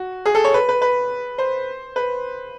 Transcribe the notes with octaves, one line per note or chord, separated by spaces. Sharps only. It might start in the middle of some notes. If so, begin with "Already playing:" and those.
Already playing: F#4
G#4
A4
C#5
B4
B4
B4
C5
B4